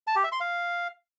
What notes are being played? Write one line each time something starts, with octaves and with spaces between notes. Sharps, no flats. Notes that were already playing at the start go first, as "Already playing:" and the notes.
A5
G4
E5
C6
F5